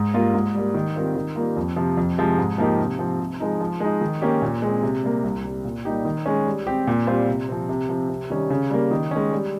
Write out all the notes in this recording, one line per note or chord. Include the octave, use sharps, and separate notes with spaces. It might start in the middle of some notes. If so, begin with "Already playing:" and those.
Already playing: G#2
G3 A#3 F4
G#2
G3 A#3
D#3
G3 C4 F4 A#4
D#3
G3 A#3 F4
F2
C3 F3
F2
C3 F3 G#3
G#2
F3 A#3 D#4 G4
C3
F3 C4
C3
F3 G#3 D#4
F3
G#3 D#4
D#3
A#3 C#4 G4
A#2
G#3 C4
C3
G3 A#3
C2
C3 G3
A#2
G3 A#3 D#4 G4
D#3
G#3 C#4
G3
C4 G4
A#2
G3 C4 F4 C5
C3
F3 C4
C3
F3 C4
C3
D#3 G3 C#4
C#3
G3 A#3
D#3
G#3 C#4
G3